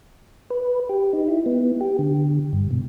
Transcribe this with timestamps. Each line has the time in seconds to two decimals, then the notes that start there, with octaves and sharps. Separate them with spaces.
0.50 B4
0.89 G4
1.13 D#4
1.28 E4
1.46 B3
1.81 G4
1.99 D3
2.53 G2
2.71 B2